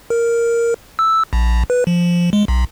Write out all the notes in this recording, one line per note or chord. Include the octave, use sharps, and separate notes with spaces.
A#4
E6
A#1
B4
F3
G#3
B1